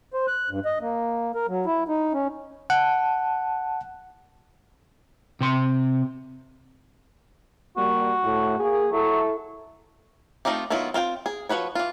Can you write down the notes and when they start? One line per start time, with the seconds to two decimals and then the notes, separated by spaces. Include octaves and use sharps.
0.13 C5
0.27 F#6
0.50 G2
0.65 D#5
0.81 A#3
1.35 A#4
1.48 F#3
1.66 E4
1.88 D#4
2.13 C#4
2.70 F#5 A5
5.41 C3 C6
7.77 G3 A#3 F#4
8.23 A2
8.59 A#3 G#4
8.92 F#3 E4 A4
10.45 A3 C4 D#4 F4 G4
10.70 D#3 F#3 B3 E4 F4
10.94 C4 F4 F5 G5
11.26 G#4
11.49 F3 F#4 B4 C#5
11.75 E3 F4